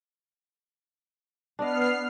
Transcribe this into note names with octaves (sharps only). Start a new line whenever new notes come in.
B3 D4 D5 D#5 F6 C7